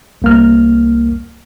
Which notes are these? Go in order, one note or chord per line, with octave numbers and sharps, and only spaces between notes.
C2 A#3 F6